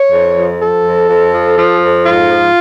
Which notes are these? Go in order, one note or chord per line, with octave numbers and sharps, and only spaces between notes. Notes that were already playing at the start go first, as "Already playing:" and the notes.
Already playing: C#5
F2
F3
F3 A4
F2
F2
F3
F3
F2
G#2 F4
F3